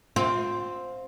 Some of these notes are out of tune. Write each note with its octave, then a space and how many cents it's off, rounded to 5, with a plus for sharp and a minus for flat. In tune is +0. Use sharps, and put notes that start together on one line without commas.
C4 +0 F4 +30